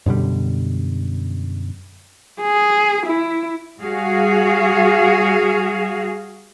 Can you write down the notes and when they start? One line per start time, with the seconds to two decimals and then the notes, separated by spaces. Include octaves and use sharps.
0.06 F#2 B2 D3 G3
2.41 G#4
3.06 E4
3.80 G3 F#4 G#4 F5